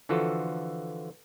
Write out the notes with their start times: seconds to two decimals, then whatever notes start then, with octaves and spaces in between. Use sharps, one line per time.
0.09 D3 E3 F3 F4 F#4 A4